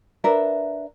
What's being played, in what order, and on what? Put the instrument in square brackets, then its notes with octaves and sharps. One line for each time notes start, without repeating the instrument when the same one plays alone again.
[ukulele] D4 A#4 B4 E5